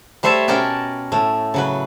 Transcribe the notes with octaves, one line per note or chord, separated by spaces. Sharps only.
G3 A3 C5 C#5 E5 A5
B2 C#4 A#4 D5 G5 A5
A2 A3
C#3 F#3 B4